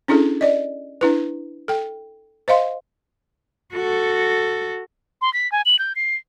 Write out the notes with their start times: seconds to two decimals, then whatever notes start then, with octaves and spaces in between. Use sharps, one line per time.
0.08 C#4 D4 E4 G#4 A4
0.41 D5 D#5
1.01 D4 E4 B4
1.68 A4 G5
2.48 C5 D#5 F5 C6
3.74 F#4 A4
5.21 C6
5.33 B6
5.52 G#5
5.65 F#7
5.79 G6
5.96 C7